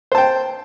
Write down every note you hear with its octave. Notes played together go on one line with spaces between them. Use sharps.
C5 G5 A5